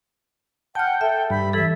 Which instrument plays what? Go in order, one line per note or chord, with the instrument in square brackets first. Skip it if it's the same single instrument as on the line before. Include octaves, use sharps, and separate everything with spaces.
[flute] F#5 [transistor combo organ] G5 [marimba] A5 F6
[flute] A4 [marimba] E5
[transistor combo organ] G2 [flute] B5
[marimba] E3 A4 [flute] E5